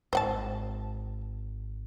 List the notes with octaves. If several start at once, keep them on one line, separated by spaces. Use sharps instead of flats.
G#1 C5 F#5 A5